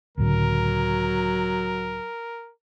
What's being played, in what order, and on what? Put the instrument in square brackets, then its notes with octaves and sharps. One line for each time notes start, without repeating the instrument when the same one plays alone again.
[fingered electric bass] C#2 A2 D3 [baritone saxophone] F#3 [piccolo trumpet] A#4